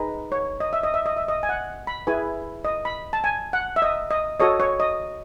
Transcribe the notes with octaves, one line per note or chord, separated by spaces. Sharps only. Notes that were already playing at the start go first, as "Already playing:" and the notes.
Already playing: D#4 G#4 B4
C#5
D#5
E5
D#5
E5
D#5
E5
D#5
G#5
F#5
B5
E4 G#4 B4 G#5
D#5
B5
A5
G#5
F#5
E5
D#5
D#5
F#4 A4 C#5 D#5
C#5
D#5